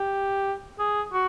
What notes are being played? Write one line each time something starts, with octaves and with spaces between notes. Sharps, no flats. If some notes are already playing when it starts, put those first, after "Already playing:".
Already playing: G4
G#4
F#4